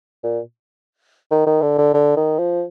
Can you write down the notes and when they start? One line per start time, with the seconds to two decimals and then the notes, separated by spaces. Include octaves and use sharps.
0.23 A#2
1.31 D#3
1.46 D#3
1.62 D3
1.78 D3
1.94 D3
2.17 D#3
2.39 F3